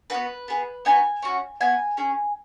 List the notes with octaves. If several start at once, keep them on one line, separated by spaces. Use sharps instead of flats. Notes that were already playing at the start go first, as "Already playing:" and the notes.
B3 F#4 B4
B3 G#4
B3 D#4 F#4 G#5
C#4 F#4
B3 F#4 G#5
C#4 G#4